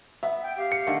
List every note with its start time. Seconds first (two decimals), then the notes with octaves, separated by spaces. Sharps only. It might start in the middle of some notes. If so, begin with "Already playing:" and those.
0.23 B3 E5
0.43 G5
0.58 G4 F5
0.72 C#7
0.87 D3 D#3 A3